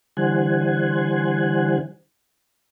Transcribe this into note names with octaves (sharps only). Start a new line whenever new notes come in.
D3 E3 G3 C5 F#5 G#5